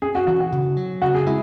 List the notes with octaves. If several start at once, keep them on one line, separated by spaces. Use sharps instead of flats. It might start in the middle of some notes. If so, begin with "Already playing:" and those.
C#4 G#4
F#4
E3 F#4
F#4
C#3
F#3
C#3 F#4
G#4
G#3 E4